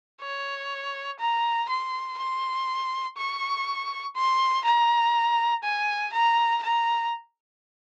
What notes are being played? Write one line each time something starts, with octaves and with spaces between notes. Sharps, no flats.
C#5
A#5
C6
C6
C#6
C6
A#5
G#5
A#5
A#5